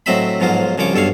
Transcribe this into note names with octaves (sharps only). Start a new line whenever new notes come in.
A2 F#3 C4 D#5 E5 B5
B1 G#2 F3 F#3 F4
C2 C#3 F3 C#5 D6
B1 G2 A4 C#5 F5